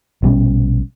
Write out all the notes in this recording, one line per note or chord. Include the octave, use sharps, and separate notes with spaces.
A#1 B2 G3 C#4